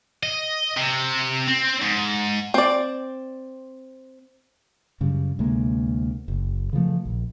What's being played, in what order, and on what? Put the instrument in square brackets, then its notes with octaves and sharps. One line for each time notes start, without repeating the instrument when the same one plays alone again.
[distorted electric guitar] D#5
C3
C4
G#2
[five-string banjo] C4 D5
[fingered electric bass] F#2 C#3 G3
D2 C3 G#3 A#3
F#1
C#3 E3 F3 A3
A#1